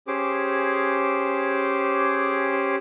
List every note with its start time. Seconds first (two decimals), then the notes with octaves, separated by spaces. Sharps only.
0.08 C#4 G4 G#4 C5 D6